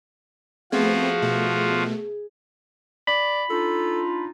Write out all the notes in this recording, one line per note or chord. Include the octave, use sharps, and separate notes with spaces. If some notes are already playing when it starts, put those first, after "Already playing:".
F3 A3 B3 C4 F4 F#4 G#4
B2 A3
D5 B5
D4 D#4 F4 A4